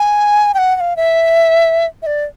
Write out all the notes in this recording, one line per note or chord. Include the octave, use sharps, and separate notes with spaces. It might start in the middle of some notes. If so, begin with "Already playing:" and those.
Already playing: G#5
G5
F#5
F#5
F5
E5
E5
D5